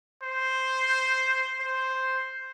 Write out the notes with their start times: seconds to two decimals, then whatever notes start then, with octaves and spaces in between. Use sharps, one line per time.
0.23 C5
1.61 C5